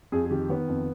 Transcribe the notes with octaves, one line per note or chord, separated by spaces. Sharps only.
F2 G#4
G#4
D#3 G4
D#3 B3
F2